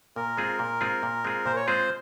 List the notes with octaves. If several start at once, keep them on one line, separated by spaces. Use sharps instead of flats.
A#2 A#4
G#3 C4 F4 G#4
A#2
G#3 C4 F4 G#4
A#2
G#3 C4 F4 G#4
A#2 C5
C#5
G#3 C4 F4 G#4 C5